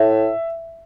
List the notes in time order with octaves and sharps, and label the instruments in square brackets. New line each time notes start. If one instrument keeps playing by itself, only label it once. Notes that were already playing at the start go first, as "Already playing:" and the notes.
Already playing: [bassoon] A2 [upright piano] E5